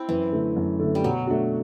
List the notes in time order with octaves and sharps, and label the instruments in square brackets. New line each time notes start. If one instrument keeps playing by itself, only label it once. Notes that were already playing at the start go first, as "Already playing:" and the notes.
Already playing: [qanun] C4 E4
[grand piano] F#2 [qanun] E3
[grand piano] D3 A3
F#2
D3 A3
[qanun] G3
[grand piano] B2 [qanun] F#3
[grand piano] A3 D4 F#4